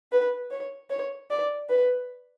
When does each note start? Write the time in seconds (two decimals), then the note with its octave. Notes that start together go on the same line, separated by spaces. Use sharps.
0.12 B4
0.51 C#5
0.90 C#5
1.30 D5
1.69 B4